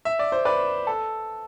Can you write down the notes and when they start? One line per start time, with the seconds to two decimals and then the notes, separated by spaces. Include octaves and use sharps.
0.05 E5
0.19 D5
0.32 C5
0.45 B4 D5
0.87 A4